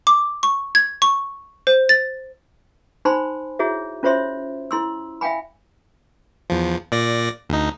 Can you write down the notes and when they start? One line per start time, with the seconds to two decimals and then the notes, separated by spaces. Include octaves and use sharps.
0.07 D6
0.43 C#6
0.75 G#6
1.02 C#6
1.67 C5
1.89 A6
3.05 D#4 C5 G#5 B5 C6
3.59 E4 F#4 G#4 C#5 E5
4.03 C#4 F4 C5 C#5 E5 C6
4.71 E4 C6 E6
5.21 E5 F5 G5 G#5 B5
6.50 E2 F3
6.92 A#2 D5 A#6
7.50 D2 D#4